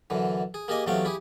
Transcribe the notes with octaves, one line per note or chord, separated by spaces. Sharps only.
F#2 D3 E3
G#4
A#3 G4 G#4 D#5 G#5
E2 C3 F#3 A3 F5 G5
E4 G4 G#4